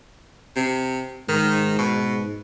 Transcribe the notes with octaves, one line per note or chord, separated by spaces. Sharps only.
C3
G#2 D#3
B2